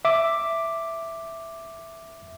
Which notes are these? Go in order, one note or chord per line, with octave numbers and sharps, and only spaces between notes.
E5 D6